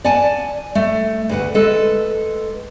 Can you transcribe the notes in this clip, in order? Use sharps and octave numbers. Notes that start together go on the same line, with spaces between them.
D5 F#5 G#5 A5
A3
D2 B4 F#5
G#3 A4 B4